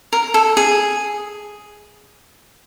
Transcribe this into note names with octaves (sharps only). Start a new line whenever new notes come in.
A#4
A4
G#4